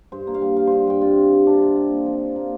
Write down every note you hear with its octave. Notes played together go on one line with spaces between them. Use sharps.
G2 C5
A#3
F5
G3
G3 F5
G2 C5
G2 G5
C3 F4
C3
C3
C3 D4
C3
A#3
F3
F3
F3
A#3